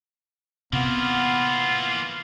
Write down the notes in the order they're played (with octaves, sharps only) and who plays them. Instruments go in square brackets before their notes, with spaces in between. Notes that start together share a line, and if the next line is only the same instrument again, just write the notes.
[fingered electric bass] C3 [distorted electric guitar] E3 A#3 [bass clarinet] B3 [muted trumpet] F4